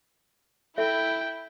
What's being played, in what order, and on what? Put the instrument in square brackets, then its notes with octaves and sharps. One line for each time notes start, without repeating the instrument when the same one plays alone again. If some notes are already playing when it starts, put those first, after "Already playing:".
[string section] E4 [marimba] A4 [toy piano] E5 [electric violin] G5